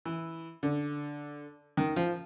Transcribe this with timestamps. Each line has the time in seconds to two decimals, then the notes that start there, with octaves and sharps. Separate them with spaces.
0.05 E3
0.63 D3
1.77 D#3
1.96 F3